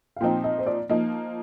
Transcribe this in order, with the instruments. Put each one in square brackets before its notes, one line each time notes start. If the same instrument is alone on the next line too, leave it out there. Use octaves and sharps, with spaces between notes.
[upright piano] F5
[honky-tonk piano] A#2 F3 C4 D#4 [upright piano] G5
[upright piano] D#5
C5
D5
[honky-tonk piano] F3 A#3 D#4 [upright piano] D#5